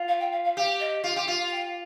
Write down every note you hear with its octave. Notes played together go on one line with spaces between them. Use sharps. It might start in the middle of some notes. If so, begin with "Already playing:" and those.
Already playing: F4
F5
G5
F5
F5
G4 F5
D#5
F4
G4
F4
G5